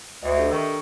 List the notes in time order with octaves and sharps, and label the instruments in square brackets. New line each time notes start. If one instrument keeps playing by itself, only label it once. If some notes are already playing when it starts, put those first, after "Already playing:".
[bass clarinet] D2 [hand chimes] D#5 E5
[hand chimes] D4 G4 A4
[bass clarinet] D#3 [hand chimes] A#5 C#6 E6